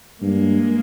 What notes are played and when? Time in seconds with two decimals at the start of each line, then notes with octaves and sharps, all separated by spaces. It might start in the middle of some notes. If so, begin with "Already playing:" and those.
0.21 G2 G#3 A#3